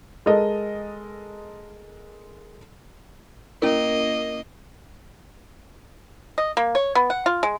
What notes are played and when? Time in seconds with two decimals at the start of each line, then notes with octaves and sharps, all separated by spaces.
0.26 G#3 A4 A#4 D#5
3.62 A#3 C#4 E4 A#4 D#5
6.38 D#5
6.57 A#3
6.75 C#5
6.95 B3
7.10 F#5
7.26 F4
7.43 G#3